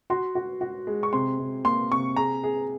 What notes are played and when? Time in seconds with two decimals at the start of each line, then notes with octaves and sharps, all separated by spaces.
0.10 F#4 C6
0.35 F#4
0.61 F#4
0.87 G#3
1.03 C#6
1.13 C3 C6
1.39 C3
1.65 A#3 C6
1.91 C3 C#6
2.16 G#4 A#5
2.44 G#4